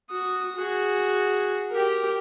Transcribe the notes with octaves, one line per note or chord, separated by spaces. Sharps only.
F#4 D#6
F#4 G#4
G4 A#4